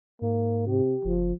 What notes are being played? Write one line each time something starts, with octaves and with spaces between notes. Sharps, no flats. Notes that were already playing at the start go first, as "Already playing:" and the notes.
G#2 A#3
C3 G4
F#1 F3